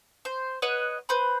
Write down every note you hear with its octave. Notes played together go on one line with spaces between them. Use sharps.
C5
B4 C#5 D#5 F#5
B4 C5 B5